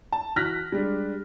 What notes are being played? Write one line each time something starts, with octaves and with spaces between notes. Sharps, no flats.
A5
E3 F#4 F6 F#6 A#6 B6
G3 G#3 D4